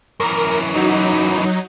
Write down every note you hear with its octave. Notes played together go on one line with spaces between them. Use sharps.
F#2 E3 A#4
F#3 D#4